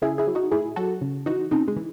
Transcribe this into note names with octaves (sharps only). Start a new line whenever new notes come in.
C#3 E4 G#4
E4 G#4
F#3
D#4 F#4
A2 E4 G#4
F#3 F#4 A4
C#3
E3 D#4 F#4
C#3 C4 D#4
G#3
E3